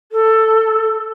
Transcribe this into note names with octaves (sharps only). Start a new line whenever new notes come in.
A4